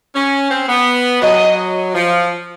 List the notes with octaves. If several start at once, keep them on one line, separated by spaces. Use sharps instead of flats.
C#4
C4
B3
F#3 D#5
F3